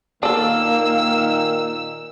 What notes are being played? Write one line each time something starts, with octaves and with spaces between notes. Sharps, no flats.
A#2 D#3 A#3 D4 A4 E6